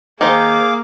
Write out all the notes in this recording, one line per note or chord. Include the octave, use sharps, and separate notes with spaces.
D#3 A#3 G#4 C5 F5 D6